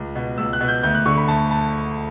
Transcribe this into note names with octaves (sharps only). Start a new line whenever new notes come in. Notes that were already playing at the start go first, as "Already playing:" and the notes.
Already playing: C#2
B2
C#2 E6
F#6
B2
G6
D2 G6
F#6
D3 C#6
B5
D2 A5
A5